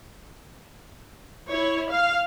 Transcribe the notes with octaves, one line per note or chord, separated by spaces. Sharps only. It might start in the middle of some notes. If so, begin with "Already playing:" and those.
E4 C#5
F5